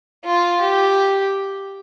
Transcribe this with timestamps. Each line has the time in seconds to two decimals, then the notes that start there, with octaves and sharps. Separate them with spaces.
0.25 F4
0.60 G4